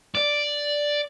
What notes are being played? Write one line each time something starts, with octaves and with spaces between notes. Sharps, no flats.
D5